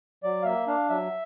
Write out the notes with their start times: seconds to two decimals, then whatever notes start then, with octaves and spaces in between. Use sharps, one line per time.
0.23 F#3 D5
0.42 F5
0.45 A#3 E5
0.67 D4 F5
0.89 F#3 E5